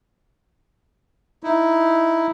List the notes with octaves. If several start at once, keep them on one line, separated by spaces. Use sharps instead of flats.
D#4 E4